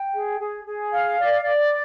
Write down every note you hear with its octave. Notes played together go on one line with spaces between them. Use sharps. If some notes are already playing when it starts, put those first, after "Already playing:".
Already playing: G5
G#4
G#4
G#4
F5
D5
D5